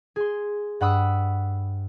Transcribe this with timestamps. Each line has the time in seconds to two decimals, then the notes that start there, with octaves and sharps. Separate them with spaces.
0.16 G#4 C6
0.81 G2 F#5 B5 D#6 E6